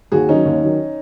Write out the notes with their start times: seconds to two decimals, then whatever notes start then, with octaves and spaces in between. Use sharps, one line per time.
0.12 D#2 F#4 G#4
0.29 D#3 F#3 C#4 D#4
0.45 D#2
0.62 D#3 F#3